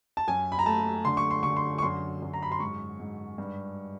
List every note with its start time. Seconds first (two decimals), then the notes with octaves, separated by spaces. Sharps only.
0.17 A5
0.28 F#2 G#5
0.52 B5
0.59 A#5
0.66 A3 A5
1.05 D3 C6
1.17 C#6
1.31 C6
1.43 D3 C#6
1.57 C6
1.78 C#6
1.82 F#2 C6
2.22 F#2
2.34 A#5
2.42 B5
2.52 C6
2.60 G#2 C#6
3.00 G#2
3.38 G2